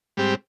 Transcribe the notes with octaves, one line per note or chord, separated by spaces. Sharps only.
G#2 G3 C4 G4